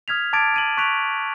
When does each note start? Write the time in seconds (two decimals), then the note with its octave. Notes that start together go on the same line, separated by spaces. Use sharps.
0.08 D#6 F6 G#6 B6 F7
0.33 A5 D6 G#6 A6 D7
0.54 G#6 D#7 F#7
0.77 C#6 F#6 B6 D7 F7